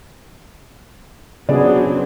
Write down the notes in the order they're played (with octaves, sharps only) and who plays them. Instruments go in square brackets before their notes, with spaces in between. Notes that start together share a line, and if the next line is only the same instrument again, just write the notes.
[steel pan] C#3 B3 G#4 [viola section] F#3 C4 [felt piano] D4 D5